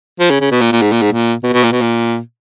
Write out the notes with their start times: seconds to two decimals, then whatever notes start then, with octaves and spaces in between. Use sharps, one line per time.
0.20 F3
0.31 C#3
0.41 C#3
0.51 B2
0.61 A#2
0.72 A#2
0.82 G#2
0.92 A#2
1.02 G#2
1.12 A#2
1.43 B2
1.53 B2
1.64 A#2
1.72 B2
1.81 A#2